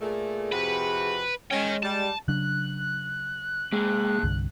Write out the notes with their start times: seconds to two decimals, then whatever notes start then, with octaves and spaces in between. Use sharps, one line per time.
0.01 A#2 A3 G#4
0.52 F2 C3 F#4 B4
1.51 G#3 C#4 D#5 G5
1.83 G3 A5
2.28 C#3 F#3 D4 F#6
3.72 G#3 A#3 G#4
4.23 C2 G2 D3